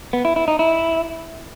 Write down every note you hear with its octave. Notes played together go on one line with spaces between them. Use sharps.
B3
E4
E4
D#4
E4